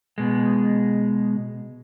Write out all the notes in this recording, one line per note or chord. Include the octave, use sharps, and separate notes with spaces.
B2 G#3